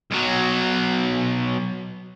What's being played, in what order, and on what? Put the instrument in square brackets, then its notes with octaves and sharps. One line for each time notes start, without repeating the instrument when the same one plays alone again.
[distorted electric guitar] B1 F#3